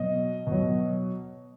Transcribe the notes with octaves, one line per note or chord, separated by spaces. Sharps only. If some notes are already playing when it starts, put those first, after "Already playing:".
Already playing: B2 F#3 D#5
B2 F#3